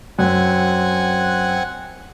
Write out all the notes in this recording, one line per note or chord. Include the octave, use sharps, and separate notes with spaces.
F#2 C4 F#5 G#5